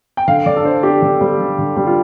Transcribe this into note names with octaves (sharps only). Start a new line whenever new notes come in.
G5
D3 F5
D3 D5
A4
D4 C5
D4 G4
D3
G3
D3
D3
G3
F4